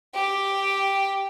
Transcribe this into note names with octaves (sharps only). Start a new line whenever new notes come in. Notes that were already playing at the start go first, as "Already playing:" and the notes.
G4